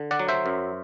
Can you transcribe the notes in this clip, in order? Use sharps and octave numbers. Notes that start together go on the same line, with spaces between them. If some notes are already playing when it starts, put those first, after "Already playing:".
Already playing: D3
D5 F#5
F#3
C5 E5
F#2